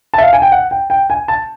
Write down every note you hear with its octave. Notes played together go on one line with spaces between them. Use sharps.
A5
E5
F5
G#5
G5
F#5
G5
G5
G#5
A5